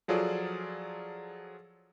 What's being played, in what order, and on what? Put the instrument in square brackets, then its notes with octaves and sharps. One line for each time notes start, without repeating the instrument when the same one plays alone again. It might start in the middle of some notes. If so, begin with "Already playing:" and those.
[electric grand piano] F3 F#3 F4 G#4 A4 D5